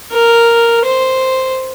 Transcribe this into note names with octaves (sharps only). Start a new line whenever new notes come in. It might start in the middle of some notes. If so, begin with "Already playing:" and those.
A#4
C5